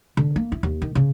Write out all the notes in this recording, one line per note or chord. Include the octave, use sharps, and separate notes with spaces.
D3
A#3
E4
D#2
D#3
C#3